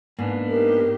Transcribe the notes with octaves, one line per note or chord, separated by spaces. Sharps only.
G#2 A#3 B3 D4
D#4 G4 A#4